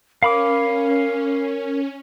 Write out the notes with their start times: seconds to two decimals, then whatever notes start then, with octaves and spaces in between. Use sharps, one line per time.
0.23 C#4 A#4 F5 B5 D6